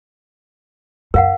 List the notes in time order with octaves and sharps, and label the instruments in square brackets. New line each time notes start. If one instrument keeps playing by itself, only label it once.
[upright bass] F#2 [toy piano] A#4 F5 F#5